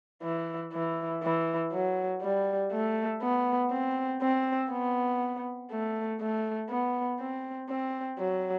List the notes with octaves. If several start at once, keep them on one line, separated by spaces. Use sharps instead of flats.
E3
E3
E3
F#3
G3
A3
B3
C4
C4
B3
A3
A3
B3
C4
C4
F#3